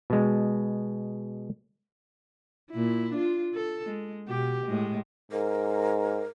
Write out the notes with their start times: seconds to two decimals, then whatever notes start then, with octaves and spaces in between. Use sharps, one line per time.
0.10 B2 G#3
2.71 A#2 E4
3.13 D4 F4
3.54 A4
3.85 G#3
4.27 B2 G4
4.66 A2 G#3
5.32 G#2 A#4